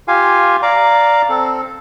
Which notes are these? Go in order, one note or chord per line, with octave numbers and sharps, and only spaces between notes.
F4 G4 F5 G#5
D5 F5 A#5 D6
C4 A4